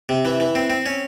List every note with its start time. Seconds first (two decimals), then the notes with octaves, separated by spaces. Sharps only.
0.09 C3
0.25 E3
0.40 E3
0.55 C4
0.70 C4
0.86 C#4